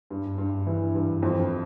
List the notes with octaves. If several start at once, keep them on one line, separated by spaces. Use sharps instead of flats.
G2
G2
E3
G2
F2